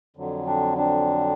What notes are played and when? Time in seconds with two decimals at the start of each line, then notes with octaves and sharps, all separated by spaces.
0.17 F2 D3 F#3
0.46 C4 D4
0.78 C4 D4